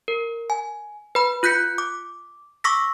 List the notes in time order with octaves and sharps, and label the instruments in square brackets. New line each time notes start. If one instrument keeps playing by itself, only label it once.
[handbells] A#4
G#5
B4 B5
F4 F#6 G6 B6 C#7
D6
C#6 D6 E6 A#6 B6